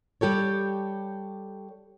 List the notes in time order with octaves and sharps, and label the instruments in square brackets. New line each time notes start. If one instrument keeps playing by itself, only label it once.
[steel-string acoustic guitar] G3 G4 A4 C#5